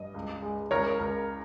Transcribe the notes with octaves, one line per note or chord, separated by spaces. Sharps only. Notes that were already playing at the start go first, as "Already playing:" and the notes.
Already playing: G2 D#5
C#2
G#3
C#2 A#4 C#5
C#2 A#4